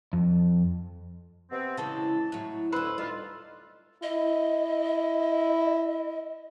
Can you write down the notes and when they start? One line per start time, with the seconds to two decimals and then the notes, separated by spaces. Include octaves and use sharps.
0.13 F2
1.50 C3 B3 C4
1.77 C#3 E3 G#3 A5
2.32 A2 F#3
2.72 D2 C#4 B4 C5 D#5 E6
2.98 G3 A3 D#4 F4
4.03 E4 D#5